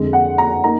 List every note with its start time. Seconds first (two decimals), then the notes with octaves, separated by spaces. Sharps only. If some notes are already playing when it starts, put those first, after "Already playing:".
Already playing: F2 D3 G#3
0.13 F#5
0.38 A#5
0.64 A#3 D#4 A#5